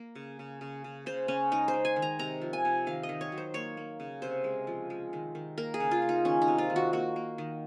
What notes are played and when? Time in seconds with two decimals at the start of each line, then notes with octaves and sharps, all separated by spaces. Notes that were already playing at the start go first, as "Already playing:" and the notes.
Already playing: A#3
0.15 C#3
0.39 C#3
0.61 C#3
0.84 C#3
1.06 C#3 C5
1.28 C#3 C#4
1.51 G#3 D#4
1.68 C5
1.74 G#3
1.85 G#5
1.96 D#3
2.02 A#5
2.19 C3 A#5
2.41 F3
2.53 G#5
2.65 C3
2.87 D#3 F5
3.03 D#5
3.09 D#3
3.21 C#5
3.32 F#3
3.38 C5
3.54 A#3 C#5
3.77 A#3
4.00 C#3
4.22 C3 C5
4.44 G#3
4.67 F3
4.90 G#3
5.13 D#3
5.35 D#3
5.58 A#3 A#4
5.74 G#4
5.80 C#3
5.91 F4
6.02 C#3
6.09 D#4
6.25 D#3 C#4
6.42 D#4
6.48 C3
6.58 F4
6.70 D#3
6.76 F#4
6.93 A#3 F#4
7.16 A#3
7.38 D#3